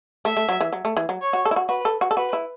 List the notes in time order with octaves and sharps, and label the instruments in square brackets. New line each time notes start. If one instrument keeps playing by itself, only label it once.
[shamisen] A3 [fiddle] E5
[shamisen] A3
F#3
E3
F#3
A3
E3
F#3
[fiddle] C#5
[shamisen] F#4
A4
E4
F#4
[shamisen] F#4 [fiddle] B4
[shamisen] A4
F#4
A4
[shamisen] F#4 [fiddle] B4
[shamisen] E4